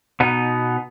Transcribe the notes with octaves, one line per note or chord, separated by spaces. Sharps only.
B2 B3 D#4